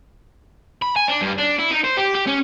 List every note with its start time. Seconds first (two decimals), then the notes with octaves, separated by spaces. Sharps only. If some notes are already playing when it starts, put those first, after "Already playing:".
0.82 B5
0.96 G#5
1.08 D4
1.21 G2
1.38 D4
1.59 E4
1.71 D#4
1.84 C5
1.97 G4
2.15 G4
2.27 C#4